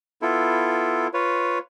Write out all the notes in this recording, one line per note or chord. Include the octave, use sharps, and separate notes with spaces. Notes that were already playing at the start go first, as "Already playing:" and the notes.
B3 E4 F4 A4
F4 B4 C#5